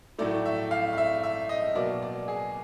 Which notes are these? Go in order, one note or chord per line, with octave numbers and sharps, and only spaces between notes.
A2 F#3 A3 D5
E5
F5
F5
E5
E5
D#5
B2 F#3 A#3 D5
D5
G#4